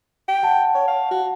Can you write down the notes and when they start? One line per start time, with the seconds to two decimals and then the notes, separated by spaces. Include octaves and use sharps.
0.28 G5
0.43 F#5 A5
0.75 C#5
0.88 F5
1.11 F#4